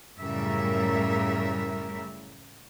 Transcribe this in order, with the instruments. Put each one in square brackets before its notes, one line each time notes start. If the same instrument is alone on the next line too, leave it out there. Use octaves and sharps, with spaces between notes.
[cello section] F#2 A2 C#3 G3 A#4 E5